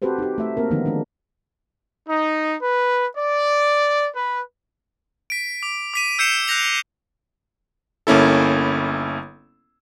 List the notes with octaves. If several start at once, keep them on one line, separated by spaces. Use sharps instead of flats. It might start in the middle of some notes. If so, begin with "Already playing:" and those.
C4 F#4 G4 A4 B4 C5
D#4 G4
A3 E5
A#3 C4 A#4
D3 D#3 F3 A3 B3 D#4
D#3 G#3 D4
D#4
B4
D5
B4
B6 D7
D6
D6 B6 D#7
E6 G6 C7 C#7 E7
F#6 G6 A#6 F7
G1 A#3 C#4 E4 A4